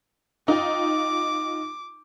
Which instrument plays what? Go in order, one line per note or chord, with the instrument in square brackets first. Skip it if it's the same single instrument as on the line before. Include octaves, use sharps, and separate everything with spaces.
[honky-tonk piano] D#4 F4 G5 [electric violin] D6